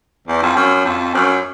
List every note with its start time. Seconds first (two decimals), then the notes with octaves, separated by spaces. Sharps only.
0.27 E2
0.42 F2
0.56 F#2
0.85 F2
1.14 F#2